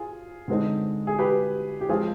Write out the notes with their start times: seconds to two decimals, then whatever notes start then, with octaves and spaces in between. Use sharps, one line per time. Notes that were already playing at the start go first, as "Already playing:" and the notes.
Already playing: F4 G#4
0.48 D3 G#3 C4 D#4
1.07 G#4
1.18 G4 B4
1.81 G4
1.89 F3 G#3 C4 F4 G#4